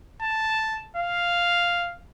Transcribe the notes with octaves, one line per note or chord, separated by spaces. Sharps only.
A5
F5